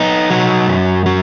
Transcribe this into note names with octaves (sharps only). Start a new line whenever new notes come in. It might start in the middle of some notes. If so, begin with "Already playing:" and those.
Already playing: B3 D#4
F#3
F#2
F#3